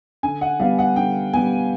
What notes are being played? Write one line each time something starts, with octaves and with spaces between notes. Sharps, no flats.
D3 G#5
F#5
G3 B3 F5
F#5
D3 G5
G3 B3 G#5